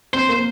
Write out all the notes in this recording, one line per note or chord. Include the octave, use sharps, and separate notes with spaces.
C4 C5
A#3